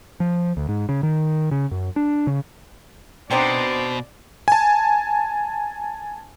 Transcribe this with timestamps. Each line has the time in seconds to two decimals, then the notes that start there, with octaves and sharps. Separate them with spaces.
0.20 F3
0.57 D2
0.69 G#2
0.89 C#3
1.03 D#3
1.51 C#3
1.71 F#2
1.96 D4
2.27 C#3
3.31 B2 C4 D4 D#4 C5 D5
4.48 G#5 A5